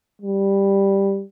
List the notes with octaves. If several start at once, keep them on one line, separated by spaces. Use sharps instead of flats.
G3